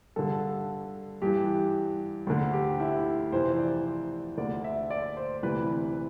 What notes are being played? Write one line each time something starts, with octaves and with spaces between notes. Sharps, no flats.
G2 D3 A4
G2 E3 G4
D2 D3
G4
E4
F2 C3 E3 C5
D5
D2 D3 D5
E5
D5
C5
D2 C3 E3 B4